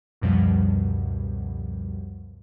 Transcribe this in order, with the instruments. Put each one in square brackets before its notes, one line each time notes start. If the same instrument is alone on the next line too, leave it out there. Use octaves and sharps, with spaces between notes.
[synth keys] C#2 F#2 B2 F3 G3